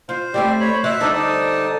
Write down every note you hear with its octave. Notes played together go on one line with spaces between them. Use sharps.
F4 C5
G3 A3 C4 G4 D5
C#5 B5
F#4 C#5 D5 E5 F#6
D3 G3 C4 D4 D#4 A4
D#4 D5 A5 D#6